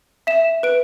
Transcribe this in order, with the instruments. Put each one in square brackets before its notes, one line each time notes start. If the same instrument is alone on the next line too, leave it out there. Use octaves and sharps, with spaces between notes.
[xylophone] E5 E7
B4 D7